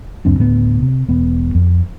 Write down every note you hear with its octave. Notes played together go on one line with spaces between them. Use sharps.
C#2 F#2 C4 D4
D2 A2 G3 B3
C3
E1 B3
F2